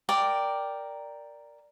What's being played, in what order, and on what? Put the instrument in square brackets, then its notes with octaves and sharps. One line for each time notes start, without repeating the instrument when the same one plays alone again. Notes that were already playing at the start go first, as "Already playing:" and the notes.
[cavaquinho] A#4 D5 G5